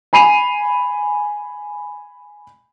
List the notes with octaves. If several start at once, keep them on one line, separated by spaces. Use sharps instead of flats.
G#5 B5 C7 D#7 F7